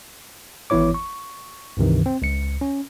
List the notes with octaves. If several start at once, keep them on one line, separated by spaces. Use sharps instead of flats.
G#1 E3 B3 E4 C#5 D6
C#6
C#2 G2 C3 D#3 E3
C4
C#2 C#7
C#4